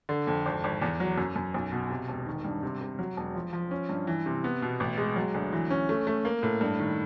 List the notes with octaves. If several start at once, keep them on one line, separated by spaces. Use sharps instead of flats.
D3
F2
G#1
G#1
E2
F#3
F#2
F#2
B1
B2
C3
E1
D#3
G2
C3
C3
F#3
E1
F3
F3
C#4
G2
E3
C3
B3
B2
A1
G#3
F#3
D2
E3
C#4
A3
A3
A#3
A2
G2
D#3